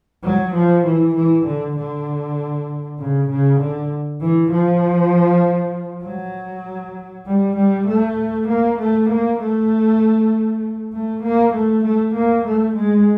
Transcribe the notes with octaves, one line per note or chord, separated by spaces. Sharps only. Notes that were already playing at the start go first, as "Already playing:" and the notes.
F#3
F3
E3
E3
D3
D3
C#3
C#3
D3
E3
F3
F#3
G3
G3
A3
A#3
A3
A#3
A3
A3
A#3
A3
A3
A#3
A3
G#3